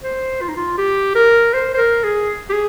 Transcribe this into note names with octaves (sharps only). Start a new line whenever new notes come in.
C5
F4
D#4
F4
G4
A#4
C5
C5
A#4
G#4
G4
G#4